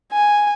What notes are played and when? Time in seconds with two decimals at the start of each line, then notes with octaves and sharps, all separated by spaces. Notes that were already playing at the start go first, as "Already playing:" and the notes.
0.12 G#5